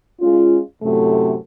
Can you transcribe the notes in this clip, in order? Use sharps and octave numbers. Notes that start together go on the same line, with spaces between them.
G#3 C#4 F4
F#2 A2 C3 A3